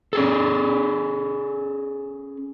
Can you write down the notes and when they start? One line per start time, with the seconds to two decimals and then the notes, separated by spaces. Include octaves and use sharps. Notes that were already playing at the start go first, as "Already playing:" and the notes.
0.13 C#4 G#4 A4